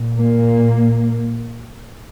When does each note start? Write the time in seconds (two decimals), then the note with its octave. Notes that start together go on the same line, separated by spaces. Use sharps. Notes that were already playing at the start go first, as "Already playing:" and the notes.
Already playing: A#2
0.17 A#3